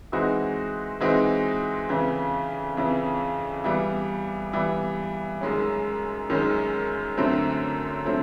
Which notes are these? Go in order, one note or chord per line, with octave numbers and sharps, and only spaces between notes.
E3 G#3 C4 D#4 F#4
E3 G#3 C4 D#4 F#4
F2 C#3 E3
F2 C#3 E3
E3 G3 B3
E3 G3 B3
F#2 D#3 G#3 C#4
F#2 D#3 G#3 C#4
F#2 D3 F#3 A3 C4
D3 F#3 A3 C4